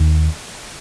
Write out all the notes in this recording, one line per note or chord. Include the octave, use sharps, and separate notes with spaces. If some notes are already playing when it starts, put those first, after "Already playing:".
Already playing: D#2